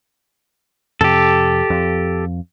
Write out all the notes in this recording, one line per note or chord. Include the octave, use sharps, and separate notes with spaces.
F2 C3 G4 A4
F2